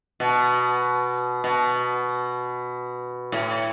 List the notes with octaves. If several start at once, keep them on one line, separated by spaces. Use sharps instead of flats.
B2
B2
A2